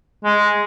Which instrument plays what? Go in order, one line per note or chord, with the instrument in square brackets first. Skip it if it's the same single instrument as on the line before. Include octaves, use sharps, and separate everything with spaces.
[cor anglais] G#3